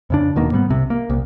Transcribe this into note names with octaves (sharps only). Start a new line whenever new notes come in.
F2 C#3 D4
D#1 B2 D#3 A#3
G#2 G3 B3
C2 C3
A#3
C2